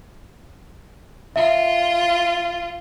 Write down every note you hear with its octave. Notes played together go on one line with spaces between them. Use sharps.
F4 E5